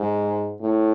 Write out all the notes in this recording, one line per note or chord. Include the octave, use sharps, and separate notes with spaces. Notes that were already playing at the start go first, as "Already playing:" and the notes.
Already playing: G#2
A2